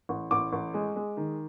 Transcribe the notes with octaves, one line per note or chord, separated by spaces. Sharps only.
A1
A1 D6
A1
G#3
G#3
D#3